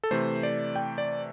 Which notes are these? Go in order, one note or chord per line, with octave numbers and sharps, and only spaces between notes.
A4
C3 E3 A3 C5
D5
G5
D5